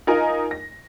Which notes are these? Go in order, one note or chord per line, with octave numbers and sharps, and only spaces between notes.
D#4 F4 A#4 D#5 G#5
A#6